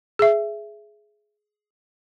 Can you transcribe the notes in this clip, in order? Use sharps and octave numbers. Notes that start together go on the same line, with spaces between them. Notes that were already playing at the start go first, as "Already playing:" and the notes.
G#4 E5